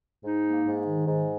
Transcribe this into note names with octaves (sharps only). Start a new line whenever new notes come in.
G#2 D#4
A#3
G#2
D#3
G#2